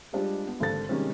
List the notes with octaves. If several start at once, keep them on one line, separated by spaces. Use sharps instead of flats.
G3 G#3 D4 F4 G4 G#4
B3
G#1 D3 A4 A6
C3 D#3 G3 G#3 C#4